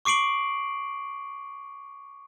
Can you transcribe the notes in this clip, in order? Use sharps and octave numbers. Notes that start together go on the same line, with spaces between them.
C#6 D6 C7 D7 F#7